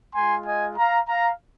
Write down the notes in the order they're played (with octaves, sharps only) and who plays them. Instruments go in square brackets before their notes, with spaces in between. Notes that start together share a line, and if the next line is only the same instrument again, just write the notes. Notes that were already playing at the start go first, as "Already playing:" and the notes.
[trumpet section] G#3 F4 G#5 C6
D#5 G#5
F5 A#5
F5 A#5